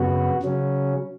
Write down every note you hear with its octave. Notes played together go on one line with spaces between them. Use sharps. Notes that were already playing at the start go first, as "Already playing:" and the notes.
Already playing: F#2 C#3 B3 F#4
C#3 F#3 C#4